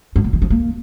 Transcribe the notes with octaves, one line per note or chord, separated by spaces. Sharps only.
G2
A#2
E3
F3
A#3